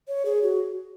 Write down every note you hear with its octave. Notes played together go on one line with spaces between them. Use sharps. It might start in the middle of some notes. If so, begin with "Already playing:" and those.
C#5
G#4
F#4